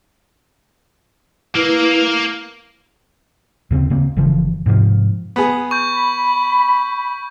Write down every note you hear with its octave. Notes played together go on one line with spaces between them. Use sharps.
A#3 E4 B4
D#2 C#3 B3 C4
C#3 A#3 C4
F#1 C#3 E3 F3
G#2 C3 D#3 F3
B3 G#4
C#6 G6
B5